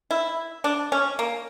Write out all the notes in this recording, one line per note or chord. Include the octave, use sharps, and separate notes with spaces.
E4
D4
C#4
A#3